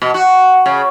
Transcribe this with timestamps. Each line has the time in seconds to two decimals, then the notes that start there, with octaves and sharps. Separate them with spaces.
0.02 B2
0.14 F#4
0.66 C#3